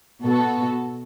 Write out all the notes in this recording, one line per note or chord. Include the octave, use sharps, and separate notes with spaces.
B2 B3 F#4 A4